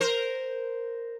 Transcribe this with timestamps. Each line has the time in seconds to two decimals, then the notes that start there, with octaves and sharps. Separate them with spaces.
0.01 A#4 C5